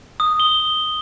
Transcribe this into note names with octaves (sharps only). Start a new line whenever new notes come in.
D#6
G7